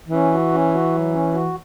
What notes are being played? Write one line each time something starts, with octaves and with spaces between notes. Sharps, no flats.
E3 C#4
F#4
C#4
F#4
F#3
C#4
F#4